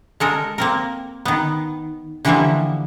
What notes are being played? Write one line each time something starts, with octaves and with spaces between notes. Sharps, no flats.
G#3 A4 A#4
A#3 C4 A#4
D#3 B3
D3 E3 F3 G3 A#3 E5